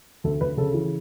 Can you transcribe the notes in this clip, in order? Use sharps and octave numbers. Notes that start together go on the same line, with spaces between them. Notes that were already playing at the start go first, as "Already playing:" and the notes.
D2 A4
D2 B4
C#3 A4
E3